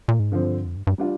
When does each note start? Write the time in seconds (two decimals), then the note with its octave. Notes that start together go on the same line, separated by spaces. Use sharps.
0.08 A#2
0.19 G#2
0.32 G2 D3 F3 C4
0.65 F2
0.76 G2
0.87 G2
0.98 G3 D4 F4